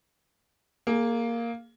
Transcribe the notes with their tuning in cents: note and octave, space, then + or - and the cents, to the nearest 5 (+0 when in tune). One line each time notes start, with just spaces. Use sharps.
A#3 +0 G#4 +30